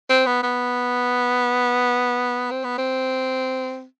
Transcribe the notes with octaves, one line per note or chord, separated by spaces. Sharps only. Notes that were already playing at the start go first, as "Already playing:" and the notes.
C4
B3
B3
C4
B3
C4